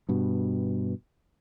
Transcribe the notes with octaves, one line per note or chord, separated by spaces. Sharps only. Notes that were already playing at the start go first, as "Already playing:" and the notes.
G2 B2